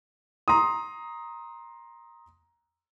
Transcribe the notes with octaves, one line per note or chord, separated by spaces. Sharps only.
A#5 C6 D#6